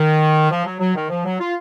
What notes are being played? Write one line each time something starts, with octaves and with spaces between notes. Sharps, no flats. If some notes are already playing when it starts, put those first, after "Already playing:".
Already playing: D#3
F3
F#3
F#3
D#3
F3
F#3
F4